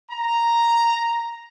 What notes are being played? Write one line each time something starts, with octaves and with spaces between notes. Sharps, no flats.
A#5